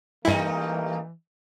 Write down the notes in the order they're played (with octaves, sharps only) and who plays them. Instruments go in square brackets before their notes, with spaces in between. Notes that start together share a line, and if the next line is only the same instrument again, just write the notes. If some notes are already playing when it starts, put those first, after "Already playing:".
[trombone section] A1 A#3 [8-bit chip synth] G2 E4 [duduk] E3 [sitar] G3 D#4